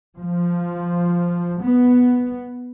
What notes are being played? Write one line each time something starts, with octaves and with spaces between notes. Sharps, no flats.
F3
B3